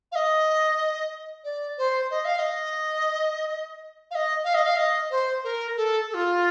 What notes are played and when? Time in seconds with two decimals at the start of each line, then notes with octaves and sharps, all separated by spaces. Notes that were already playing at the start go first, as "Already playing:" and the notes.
0.12 F5
0.15 D#5
1.44 D5
1.78 C5
2.11 D#5
2.25 F5
2.39 D#5
4.11 F5
4.15 D#5
4.44 F5
4.54 D#5
4.65 F5
4.77 D#5
5.11 C5
5.44 A#4
5.77 A4
6.10 A4
6.14 F4